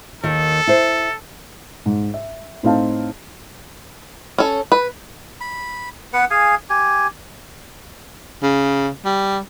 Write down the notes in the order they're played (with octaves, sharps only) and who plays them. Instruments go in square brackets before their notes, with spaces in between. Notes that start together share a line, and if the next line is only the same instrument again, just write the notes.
[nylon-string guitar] D#2 D#3 [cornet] A4
[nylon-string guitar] E4 C5
[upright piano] G#2
E5
A2 C4 D#4 F5 A5
[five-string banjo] C#4 A4
B4
[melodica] B5
B3 B4 F#5
G#4 F5 G#5
G4 G#5
[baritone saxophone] C#3
G3